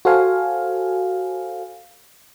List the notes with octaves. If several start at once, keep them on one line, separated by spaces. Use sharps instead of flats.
F#4 A4 C5 F5 G#5